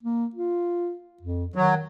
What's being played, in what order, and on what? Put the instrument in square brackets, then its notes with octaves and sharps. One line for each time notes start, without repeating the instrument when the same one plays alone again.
[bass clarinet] A#3
F4
F2
[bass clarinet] D#3 [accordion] F#3